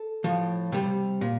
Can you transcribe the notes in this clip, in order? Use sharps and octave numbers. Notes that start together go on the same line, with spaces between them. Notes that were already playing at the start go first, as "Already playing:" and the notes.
Already playing: A4
A2 F3
C3 G3
A#2